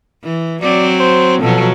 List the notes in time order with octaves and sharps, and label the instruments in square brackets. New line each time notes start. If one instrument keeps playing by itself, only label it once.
[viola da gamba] E3
[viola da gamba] F#3 C4 [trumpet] D5
[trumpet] C5
[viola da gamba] B2 F3 F#3 [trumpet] A4